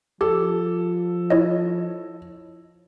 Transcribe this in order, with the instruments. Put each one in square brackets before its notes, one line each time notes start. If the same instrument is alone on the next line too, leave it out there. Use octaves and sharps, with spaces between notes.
[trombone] F3 [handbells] G4 [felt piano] A4
[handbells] E4 C#5 D#5